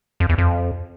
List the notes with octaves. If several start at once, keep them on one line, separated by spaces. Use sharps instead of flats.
F2
E2
F2